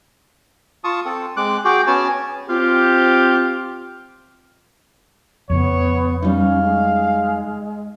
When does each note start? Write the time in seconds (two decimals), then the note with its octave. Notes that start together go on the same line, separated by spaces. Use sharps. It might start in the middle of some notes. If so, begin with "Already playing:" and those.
0.84 F4 A5 C#6 D#6
1.05 C4 A4
1.37 G#3 C4 D6 F#6
1.65 F#4 G#4 G5 D6
1.87 B3 C#4 F#4 G#5 A5
2.48 C4 F4 G4
5.50 F2 C#3 B3 C#5
6.22 G3 C#4 D#4 F5
6.61 G#3